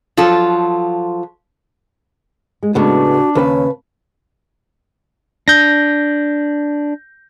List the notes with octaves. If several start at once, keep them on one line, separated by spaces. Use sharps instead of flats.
F3 F#3 F4 A4
G#3
C#2 A2 C#3 G#3 B3 D4 F#4
D#2 C#3 C#4 B4 A5
D4 G6 A#6